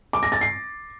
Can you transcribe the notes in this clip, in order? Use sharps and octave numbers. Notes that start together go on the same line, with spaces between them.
D6
A#6
A6
C7